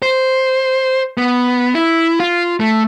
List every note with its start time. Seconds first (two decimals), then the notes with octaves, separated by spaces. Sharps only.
0.02 C5
1.18 B3
1.75 E4
2.20 F4
2.60 A3